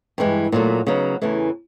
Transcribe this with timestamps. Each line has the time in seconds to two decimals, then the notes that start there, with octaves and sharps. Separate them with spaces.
0.18 G2 E3 G#3
0.52 A#2 F#3 A3
0.87 C#3 F#3 B3 D#4
1.21 E2 C#3 E3 A3